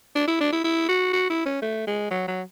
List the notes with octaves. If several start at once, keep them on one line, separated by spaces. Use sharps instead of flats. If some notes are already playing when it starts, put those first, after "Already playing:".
D4
E4
D4
E4
E4
F#4
F#4
E4
C#4
A3
G#3
F#3
F#3